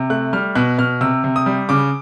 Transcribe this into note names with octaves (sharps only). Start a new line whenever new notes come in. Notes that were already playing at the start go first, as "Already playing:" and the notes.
Already playing: C3
A3 F#6
G3 F6
B2 F#6
B2 F6
C3 E6
C3
D#6
G3
C#3 D6